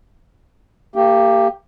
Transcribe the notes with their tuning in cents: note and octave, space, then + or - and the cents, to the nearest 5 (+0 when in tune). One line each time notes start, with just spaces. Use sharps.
A#3 -35 G4 +5